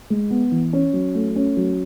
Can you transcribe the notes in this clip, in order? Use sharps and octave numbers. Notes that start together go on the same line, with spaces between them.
G#3
B3
E3
C#4
F#3
A3
C#4
F#3